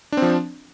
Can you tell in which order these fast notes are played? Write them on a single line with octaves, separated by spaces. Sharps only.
D4 C4 F3